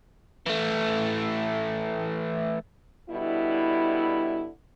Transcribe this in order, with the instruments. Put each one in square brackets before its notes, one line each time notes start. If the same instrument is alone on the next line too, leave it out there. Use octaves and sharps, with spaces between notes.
[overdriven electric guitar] E3 A3
[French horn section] B2 D3 G3 E4